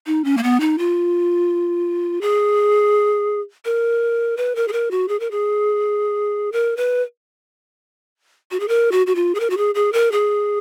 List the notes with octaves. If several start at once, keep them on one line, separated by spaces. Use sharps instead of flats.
D#4
C#4
A#3
B3
D#4
F4
G#4
A#4
B4
A#4
G#4
A#4
F#4
G#4
A#4
G#4
A#4
B4
F#4
G#4
A#4
F#4
F#4
F4
G#4
A#4
F#4
G#4
G#4
A#4
G#4